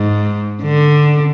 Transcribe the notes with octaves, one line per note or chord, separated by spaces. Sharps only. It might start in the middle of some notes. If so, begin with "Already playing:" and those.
Already playing: G#2
D3